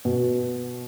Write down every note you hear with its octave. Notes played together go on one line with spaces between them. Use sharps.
B2